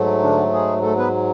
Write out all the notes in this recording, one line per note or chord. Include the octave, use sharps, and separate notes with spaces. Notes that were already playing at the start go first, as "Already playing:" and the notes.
Already playing: G#2 F#3 A3
D3 D4
G#3 G#4
A3 A4
B3 B4